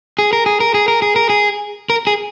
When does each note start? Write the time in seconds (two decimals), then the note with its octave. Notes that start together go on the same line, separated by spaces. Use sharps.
0.19 G#4
0.33 A#4
0.46 G#4
0.60 A#4
0.74 G#4
0.88 A#4
1.02 G#4
1.16 A#4
1.30 G#4
1.90 A#4
2.07 G#4